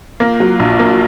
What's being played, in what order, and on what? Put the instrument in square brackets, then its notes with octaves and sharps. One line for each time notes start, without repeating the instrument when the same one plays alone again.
[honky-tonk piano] A#3 [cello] F4
[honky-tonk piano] F#3
A#1
A#3